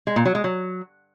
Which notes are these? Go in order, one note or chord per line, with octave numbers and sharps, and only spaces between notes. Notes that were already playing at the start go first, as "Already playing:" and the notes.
G#3
A#2
F#3
G#3
F#3